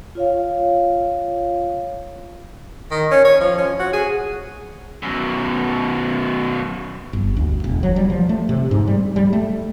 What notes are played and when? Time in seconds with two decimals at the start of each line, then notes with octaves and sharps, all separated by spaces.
0.15 F4 C#5 F5
2.91 D#3
3.11 C#4
3.25 C#5
3.41 F3
3.58 C#4
3.79 F#4
3.93 G#4
5.03 F#2 B2
7.13 G1
7.36 D2
7.64 E1
7.83 F#3
7.96 G3
8.10 F3
8.29 A3
8.49 C3
8.71 G#2
8.87 G3
9.16 G3
9.33 A3